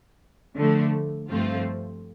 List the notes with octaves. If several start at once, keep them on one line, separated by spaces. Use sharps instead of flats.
D3 F3 A3
G2 F3 A3 C4 F4